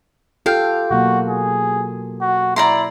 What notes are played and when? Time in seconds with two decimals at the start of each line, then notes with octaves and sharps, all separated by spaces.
0.46 F4 G4 A4 F5 G5
0.91 B2 F#3 A#3 F#4
1.29 G#4
2.21 F#4
2.56 E4 D5 A#5 C6